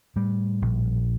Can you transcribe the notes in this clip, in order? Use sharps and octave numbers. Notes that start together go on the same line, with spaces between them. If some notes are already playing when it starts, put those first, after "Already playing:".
A2 G3
A#1